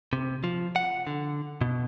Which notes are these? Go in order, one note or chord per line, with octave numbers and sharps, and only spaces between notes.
C3
F3
F#5
D3
B2